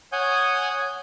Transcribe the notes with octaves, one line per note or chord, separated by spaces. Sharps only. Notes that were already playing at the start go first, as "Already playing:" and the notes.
C#5 F#5 G#5 D#6 G6